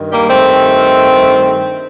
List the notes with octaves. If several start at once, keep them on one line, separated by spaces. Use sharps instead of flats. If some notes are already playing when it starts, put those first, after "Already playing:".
Already playing: G2 D#3
G3 A#3
A3 C4